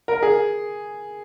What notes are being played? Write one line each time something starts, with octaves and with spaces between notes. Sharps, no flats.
A#4
G#4